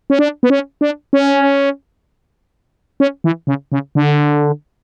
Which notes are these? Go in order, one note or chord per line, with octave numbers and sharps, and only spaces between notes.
C#4
D4
B3
C#4
D4
C#4
C#4
E3
C#3
C#3
D3